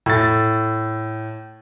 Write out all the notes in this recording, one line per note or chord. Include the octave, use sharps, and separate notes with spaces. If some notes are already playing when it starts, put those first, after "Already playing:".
A2 A6